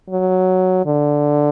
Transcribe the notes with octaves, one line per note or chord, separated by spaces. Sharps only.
F#3
D3